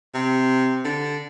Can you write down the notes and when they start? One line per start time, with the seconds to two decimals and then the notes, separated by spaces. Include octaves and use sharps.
0.14 C3
0.85 D3